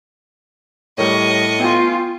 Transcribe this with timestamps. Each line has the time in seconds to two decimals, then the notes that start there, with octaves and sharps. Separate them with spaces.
0.98 A2 G3 A#4 C#5 D#5 C#6
1.59 B3 F4 G5 G#5